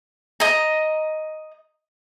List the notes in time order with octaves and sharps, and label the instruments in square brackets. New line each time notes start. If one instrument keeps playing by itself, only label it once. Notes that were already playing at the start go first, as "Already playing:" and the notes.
[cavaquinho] D#5 A#5